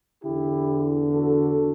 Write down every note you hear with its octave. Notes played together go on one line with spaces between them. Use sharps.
E2 D3 E4 G4
F#4 A4